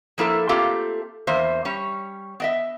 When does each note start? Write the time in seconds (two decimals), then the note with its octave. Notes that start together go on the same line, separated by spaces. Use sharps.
0.18 F3 A#3 E4 A4
0.49 A3 A#3 C4 F4 G4 A4
1.27 E2 A#3 C5 E5
1.65 G3 C#4 C#5
2.40 B3 D#5 E5